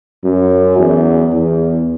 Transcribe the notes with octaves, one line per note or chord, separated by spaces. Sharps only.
F#2
E2
E2